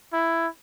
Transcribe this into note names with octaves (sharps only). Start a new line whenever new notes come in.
E4